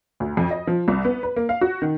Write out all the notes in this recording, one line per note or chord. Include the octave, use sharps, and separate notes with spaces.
D2
F2
D#5
F3
C2
B3
B4
A#3
F5
F#4
D#3